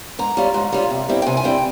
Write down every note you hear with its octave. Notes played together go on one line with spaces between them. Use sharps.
G#2 A#5
G3 C#4 F4
G#2
G3 C#4 F4
C3
G3 C4 E4
G5
C3 G#5
G#5
G3 C4 E4 G5